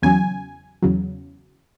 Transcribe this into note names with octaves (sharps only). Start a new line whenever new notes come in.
E2 C#3 F#3 G#5
E2 C#3 F#3